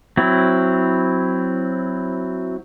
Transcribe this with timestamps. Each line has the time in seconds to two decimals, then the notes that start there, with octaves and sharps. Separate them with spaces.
0.17 F#3 C4 E4